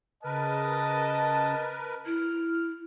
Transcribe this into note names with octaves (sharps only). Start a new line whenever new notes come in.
C#3 A#4 B4 D#5 A5
E4 F6